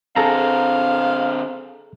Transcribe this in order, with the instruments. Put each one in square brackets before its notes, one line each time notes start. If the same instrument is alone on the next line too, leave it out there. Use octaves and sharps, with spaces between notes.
[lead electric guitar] D3 C4 [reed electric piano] G#4 A4 A#5 [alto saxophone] F5